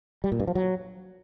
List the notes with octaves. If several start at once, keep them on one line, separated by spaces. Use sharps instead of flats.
G3
A#2
G2
F3
F#3